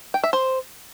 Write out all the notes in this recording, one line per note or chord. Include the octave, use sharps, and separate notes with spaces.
G5
E5
C5